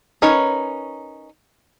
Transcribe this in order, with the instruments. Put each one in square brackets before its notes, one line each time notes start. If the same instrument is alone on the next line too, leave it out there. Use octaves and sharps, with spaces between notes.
[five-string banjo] C#4 D#4 A#4 B4 C#5